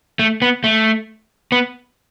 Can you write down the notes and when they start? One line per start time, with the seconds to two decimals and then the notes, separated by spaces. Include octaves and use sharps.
0.19 A3
0.42 B3
0.64 A3
1.52 B3